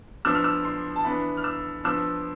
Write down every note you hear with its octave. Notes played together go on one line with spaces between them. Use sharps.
F3 B3 D4 E6
F6
E6
C6
A5
E3 B3 D4 B5
F6
E6
F3 B3 D4 E6